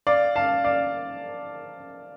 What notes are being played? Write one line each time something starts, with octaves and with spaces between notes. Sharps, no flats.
D5 F5
F5 A5
D5 F5